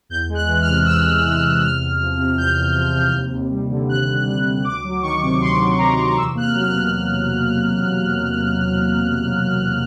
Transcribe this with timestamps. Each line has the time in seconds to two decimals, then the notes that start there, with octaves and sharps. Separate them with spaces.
0.09 E2 G6
0.29 G#3
0.35 F#6
0.47 E3
0.61 F6
0.67 C3
0.85 E2 E6
1.05 G#3
1.24 E3 F6
1.43 C3
1.61 E2 F6
1.80 E2
1.99 F3
2.18 C3
2.37 E2 G6
2.56 E2
2.75 F3
2.95 C3
3.13 D#2
3.33 D#2
3.50 G3
3.71 D3
3.89 D#2 F#6
4.08 D#2
4.26 G3 F#6
4.46 D3
4.64 D2 D6
4.84 F#3
5.02 D#3 C#6
5.22 C3
5.40 D2 C6
5.60 F#3
5.78 D#3 A#5
5.98 C3
6.16 E2 E6
6.35 A#3 F#6
6.42 F6
6.54 F#3
6.61 F6
6.67 F#6
6.74 B2